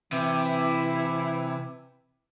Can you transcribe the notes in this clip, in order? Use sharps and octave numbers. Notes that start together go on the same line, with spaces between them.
C3 E3 E4